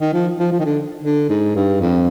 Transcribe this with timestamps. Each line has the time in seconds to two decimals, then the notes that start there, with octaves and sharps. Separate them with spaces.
0.01 D#3
0.14 F3
0.39 F3
0.52 F3
0.59 D#3
0.65 D3
1.04 D3
1.29 G#2
1.55 G2
1.81 F2